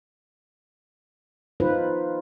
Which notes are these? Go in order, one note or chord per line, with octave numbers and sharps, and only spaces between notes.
D#4 F4 B4 C5